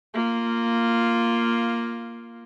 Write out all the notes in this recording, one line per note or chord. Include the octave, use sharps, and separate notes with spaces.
A#3 F4